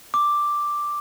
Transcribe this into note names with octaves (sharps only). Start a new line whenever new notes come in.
D6